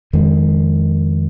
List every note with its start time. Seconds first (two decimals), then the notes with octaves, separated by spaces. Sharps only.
0.13 F2 D#3 G#3